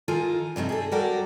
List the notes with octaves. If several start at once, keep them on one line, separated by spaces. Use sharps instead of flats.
D#3 F4 A4 A#4 G#5
G2 C3 A3 D#4
G#4 A4
F#3 G3 F#4 G4 A4 A#4